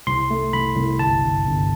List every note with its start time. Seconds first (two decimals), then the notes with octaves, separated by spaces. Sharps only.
0.07 C2 C6
0.31 A3
0.53 C2 B5
0.76 C2
0.99 G1 A5
1.22 G1
1.46 G1